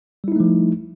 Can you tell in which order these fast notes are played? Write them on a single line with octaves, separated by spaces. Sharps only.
G3 E4 D#4 A3 F3